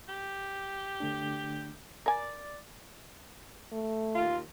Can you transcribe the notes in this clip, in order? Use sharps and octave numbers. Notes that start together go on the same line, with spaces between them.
G4
D3 A3 D4
A#4 D5 G#5 D6 A6
A3
D#2 F4